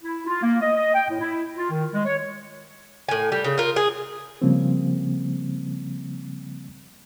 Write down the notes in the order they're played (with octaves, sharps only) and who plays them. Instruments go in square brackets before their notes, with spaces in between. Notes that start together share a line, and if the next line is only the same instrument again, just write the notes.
[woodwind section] E4
F4
A#3
D#5
D#5
G5
A2
E4
F4
D#3
G#3
C#5
[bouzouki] A2 G#5
G3
C#3
F4 A#4
G#4
[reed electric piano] C#3 F3 G3 A#3 C4